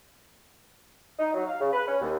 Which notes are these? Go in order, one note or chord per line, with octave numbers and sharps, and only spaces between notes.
D#4
F#3
F5
C#3
B4
C#4
D#2